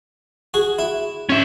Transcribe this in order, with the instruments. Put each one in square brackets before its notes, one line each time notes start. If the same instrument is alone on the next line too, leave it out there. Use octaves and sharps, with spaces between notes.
[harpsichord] F#4 G#4
E4
[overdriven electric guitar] C#4 E5